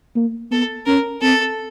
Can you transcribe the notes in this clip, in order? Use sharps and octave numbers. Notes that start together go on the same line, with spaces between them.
A#3
B3 A4
C#4 A#4
C4 A4